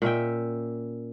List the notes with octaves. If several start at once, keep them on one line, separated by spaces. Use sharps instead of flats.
A#2 C#4 E5 G5